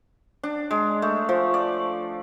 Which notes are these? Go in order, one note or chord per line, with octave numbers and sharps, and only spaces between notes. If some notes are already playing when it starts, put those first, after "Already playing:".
D4
G#3
A3
F3
D5